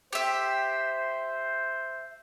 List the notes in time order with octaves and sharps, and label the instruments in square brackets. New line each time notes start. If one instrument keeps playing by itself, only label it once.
[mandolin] G4 E5 [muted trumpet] C5